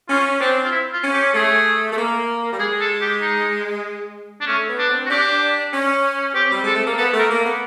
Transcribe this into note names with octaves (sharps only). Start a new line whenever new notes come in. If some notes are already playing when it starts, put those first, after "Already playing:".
C#4 F4
C4 D4
F4
E4
F4
C#4
G4
A3 G#4
A3
A#3
G3
G#3 G#4
A4
G4
D#4
D4
A3 C#4
B3
D4
C4
F#4
D4 G4
C#4
C4 G4
G3
G#3 A4
A3
A#3
B3 A4
A3 A#4
A#3
B3